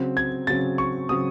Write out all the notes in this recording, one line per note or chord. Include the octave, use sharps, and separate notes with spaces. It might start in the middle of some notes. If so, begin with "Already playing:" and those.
Already playing: C#3 F#3 C4
G#6
C#3 F#3 C4 A6
C#6
C#3 F#3 C4 D#6